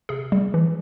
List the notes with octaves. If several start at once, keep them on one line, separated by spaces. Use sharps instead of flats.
C3 G#4
G3
E3